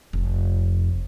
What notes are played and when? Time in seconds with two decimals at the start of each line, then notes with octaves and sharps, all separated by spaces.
0.13 F1